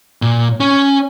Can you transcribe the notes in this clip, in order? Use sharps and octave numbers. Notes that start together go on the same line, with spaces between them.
A#2
C#4